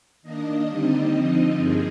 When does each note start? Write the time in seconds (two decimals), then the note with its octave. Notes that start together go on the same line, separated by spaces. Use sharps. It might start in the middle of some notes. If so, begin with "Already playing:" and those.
0.22 D#3 A#3 D4 D#5
0.67 D3 G3 C4 D#4
1.12 D3 F3 C4 D#4 D#5
1.56 G2 F3 A#3 G#4